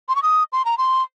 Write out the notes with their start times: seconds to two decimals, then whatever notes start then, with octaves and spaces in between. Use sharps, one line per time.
0.09 C6
0.15 C#6
0.22 D#6
0.52 C6
0.65 A#5
0.78 C6